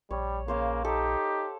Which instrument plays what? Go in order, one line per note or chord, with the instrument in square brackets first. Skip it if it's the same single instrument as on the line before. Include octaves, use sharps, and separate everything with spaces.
[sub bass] A#1 [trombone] G3 [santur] C#5
[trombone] C#3 [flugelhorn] A#3 [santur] C5 C#5 F5
[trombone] D#4 [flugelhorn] G4 [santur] A4